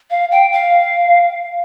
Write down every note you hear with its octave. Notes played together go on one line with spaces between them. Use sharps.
F5
G5
F5